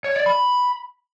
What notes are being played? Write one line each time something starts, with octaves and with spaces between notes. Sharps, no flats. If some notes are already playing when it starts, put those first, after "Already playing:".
C#5
D5
B5